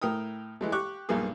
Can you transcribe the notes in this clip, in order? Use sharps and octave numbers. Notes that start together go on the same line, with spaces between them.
A2 A#4 G5 D#6
E3 G#3 A3
G4 C#6 D6 F#6
B1 G2 A#2 A#3 G#4